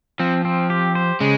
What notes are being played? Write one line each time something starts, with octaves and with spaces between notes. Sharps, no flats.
F3 C4
C4
G4
C5
C#3 G#3